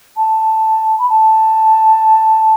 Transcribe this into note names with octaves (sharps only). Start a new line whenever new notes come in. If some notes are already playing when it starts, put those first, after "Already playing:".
A5
B5
A5